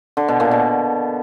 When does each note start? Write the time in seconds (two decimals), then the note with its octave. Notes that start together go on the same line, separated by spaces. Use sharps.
0.17 D3
0.28 B2
0.40 A#2
0.51 B2